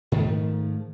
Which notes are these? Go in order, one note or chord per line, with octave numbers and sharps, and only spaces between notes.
G#2 D#3 F3 A3